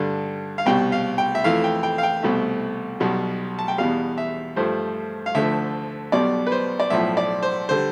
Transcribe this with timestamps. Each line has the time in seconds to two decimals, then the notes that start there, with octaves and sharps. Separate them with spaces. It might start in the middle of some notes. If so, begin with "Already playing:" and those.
Already playing: G2 D3 G3
0.58 F5
0.66 C2 B2 G3 G5
0.92 F5
1.18 G5
1.35 E5
1.44 F2 E3 A3 F5
1.64 G5
1.83 G5
1.98 F5
2.03 G5
2.23 C2 B2 A3
3.00 B1 B2 G3
3.59 A5
3.68 G5
3.78 E2 B2 G3 F5
4.18 E5
4.56 G2 F3 A3 C5
5.26 F5
5.35 D2 D3 F3 A3 E5
6.12 B1 B2 G3 D5
6.47 B4
6.52 C5
6.80 D5
6.90 B1 A2 F3 E5
7.17 D5
7.43 C5
7.69 D3 G3 C5